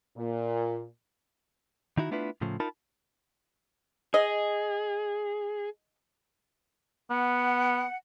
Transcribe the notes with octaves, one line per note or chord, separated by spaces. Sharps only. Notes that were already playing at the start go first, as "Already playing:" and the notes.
A#2
D#3 D#4 E4 F#4
A3 B3 D4 E4 F4 B4
A2 C#3 F3
D#4 F4 A#4 A5 B5
G#4 D#5
B3 F#5